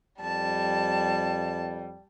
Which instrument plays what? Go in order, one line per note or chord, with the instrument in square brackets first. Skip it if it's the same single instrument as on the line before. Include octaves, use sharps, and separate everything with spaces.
[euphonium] F2 [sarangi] G3 [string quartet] A5